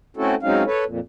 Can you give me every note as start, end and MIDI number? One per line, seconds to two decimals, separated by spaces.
0.17 0.35 57
0.17 0.35 60
0.17 0.35 61
0.17 0.35 64
0.17 0.35 66
0.17 0.35 69
0.43 0.63 54
0.43 0.63 56
0.43 0.63 60
0.43 0.63 61
0.43 0.63 63
0.43 0.63 77
0.66 0.84 69
0.66 0.84 71
0.66 0.84 73
0.86 1.00 41
0.86 1.00 46